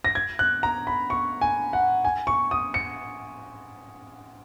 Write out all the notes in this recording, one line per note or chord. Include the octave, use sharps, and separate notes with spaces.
A#6
G#6
F#6
A#5
B5
C#6
G#5
F#5
G#5
C#6
D#6
C#7